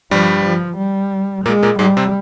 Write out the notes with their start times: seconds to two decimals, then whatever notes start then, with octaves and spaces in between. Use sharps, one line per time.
0.11 G2 F3 G3
0.45 F3
0.78 G3
1.45 A#2 G#3 A#3
1.63 A#2 A#3
1.79 G#2 G3 G#3
1.97 C3 C4